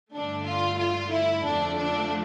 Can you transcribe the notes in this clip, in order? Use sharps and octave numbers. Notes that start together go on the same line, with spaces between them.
G2 D3 A3 D4
F4
F4
E4
F2 D3 F3 A3 D4
D4